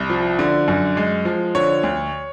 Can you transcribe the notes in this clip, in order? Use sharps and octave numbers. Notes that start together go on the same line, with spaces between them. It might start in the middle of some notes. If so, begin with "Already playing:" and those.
Already playing: C2
F3
D3
F#2
G#3
F3
D3 C#5
D2